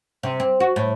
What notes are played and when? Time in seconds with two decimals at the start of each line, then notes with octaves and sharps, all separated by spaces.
0.23 C3
0.40 C4
0.60 F#4
0.76 A2